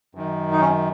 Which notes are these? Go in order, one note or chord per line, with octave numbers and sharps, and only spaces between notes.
F#2 D#3
D#4
C#4